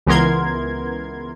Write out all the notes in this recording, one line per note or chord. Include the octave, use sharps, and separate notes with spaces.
C#2 E3 B3 A#4 C6 G#6